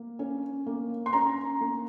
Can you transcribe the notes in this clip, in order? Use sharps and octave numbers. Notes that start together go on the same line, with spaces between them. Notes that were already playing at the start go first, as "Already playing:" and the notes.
Already playing: A#3
C#4
A#3
C6
C#4 A#5
A#3